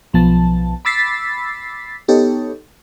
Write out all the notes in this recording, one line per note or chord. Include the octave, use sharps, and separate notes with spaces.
B1 F3 B3 A5
B5 D6 E6 A6 B6 C7
B3 D#4 G4 A4 C#5